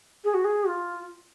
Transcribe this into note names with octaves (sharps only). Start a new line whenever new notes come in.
G#4
F#4
G#4
F4